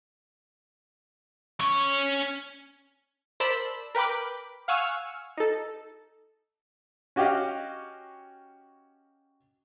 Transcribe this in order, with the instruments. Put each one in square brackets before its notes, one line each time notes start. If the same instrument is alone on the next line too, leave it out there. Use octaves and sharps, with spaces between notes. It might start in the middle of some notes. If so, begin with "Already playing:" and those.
[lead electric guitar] C#4 C#5
[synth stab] A#4 C5 D5 A5 B5 E6
A#4 B4 G5 B5 D6
F5 F#5 G#5 C#6 E6 F6
D#4 A4
[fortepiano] C#4 F#4 G4 D#5 F5